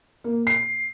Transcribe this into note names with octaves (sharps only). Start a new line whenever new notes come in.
A#3
C7